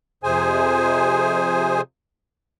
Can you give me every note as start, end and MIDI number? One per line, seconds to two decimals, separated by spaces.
0.24 1.81 41
0.24 1.81 48
0.24 1.81 68
0.24 1.81 72
0.24 1.81 80